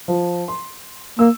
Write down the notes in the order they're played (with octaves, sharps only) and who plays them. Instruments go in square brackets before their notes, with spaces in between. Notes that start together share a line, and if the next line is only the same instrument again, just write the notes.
[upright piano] F3
C6
[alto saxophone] A#3 [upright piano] E6